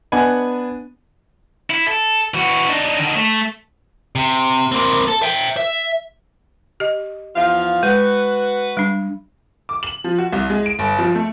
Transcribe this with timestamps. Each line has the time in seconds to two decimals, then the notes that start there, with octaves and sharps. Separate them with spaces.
0.12 B3 D4 F#5 G#5 B5
1.70 E4
1.88 A4
2.34 E3 F#4
2.68 D4 D#4
2.98 D3 D#3
3.16 A3
4.16 C3
4.72 A#3 C4
5.08 A4
5.22 E5 G5
5.57 E5
6.80 G4 D#5
7.35 E2 F3 F5
7.83 G#3 F#4 B4
8.77 G3 D4
9.69 D6
9.83 F#7
10.04 F3
10.18 F#4
10.33 C2
10.50 G#3
10.66 D7
10.79 G1
10.99 F3
11.15 A3